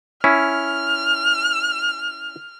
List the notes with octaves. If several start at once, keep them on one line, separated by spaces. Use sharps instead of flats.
C#4 E4 F6